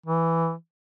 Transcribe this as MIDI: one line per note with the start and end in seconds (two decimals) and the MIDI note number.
0.06 0.53 52